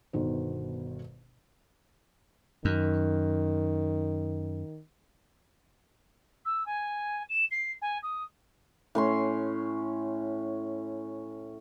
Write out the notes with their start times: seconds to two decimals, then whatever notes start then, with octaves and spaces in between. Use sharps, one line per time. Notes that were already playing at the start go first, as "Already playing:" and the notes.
0.13 G1 B2 D#3 C5
2.65 F#2 D#3
6.45 E6
6.65 G#5
7.29 E7
7.50 C7
7.81 G#5
8.02 D#6
8.95 A2 C#4 C6